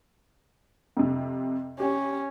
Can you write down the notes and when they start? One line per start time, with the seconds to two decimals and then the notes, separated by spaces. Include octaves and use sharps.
0.97 F2 C3
1.80 C#4 G4